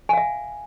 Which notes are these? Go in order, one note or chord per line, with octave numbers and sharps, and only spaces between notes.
E5 F5 G#5